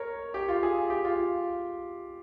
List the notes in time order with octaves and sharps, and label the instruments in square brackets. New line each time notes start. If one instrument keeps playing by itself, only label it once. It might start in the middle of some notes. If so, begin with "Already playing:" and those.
Already playing: [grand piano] A#4 C#5
G4
F4
G#4
G4
F4